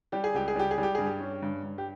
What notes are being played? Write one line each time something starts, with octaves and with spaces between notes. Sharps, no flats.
G3 G4
G#4
C#2 G4
G#4
G3 G4
G#4
G3
G4
G2 G#4
G4
C#4
G2
G2
G4